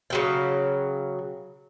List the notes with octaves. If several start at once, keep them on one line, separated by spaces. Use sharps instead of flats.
C#3 F#3 G5